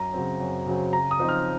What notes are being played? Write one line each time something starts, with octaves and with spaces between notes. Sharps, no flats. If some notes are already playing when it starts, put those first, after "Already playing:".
Already playing: F#2 A#5
C#3 F#3 C4
F#2
C#3 F#3 C4
C#3 A#5
D#6
F3 C4 D#4
F6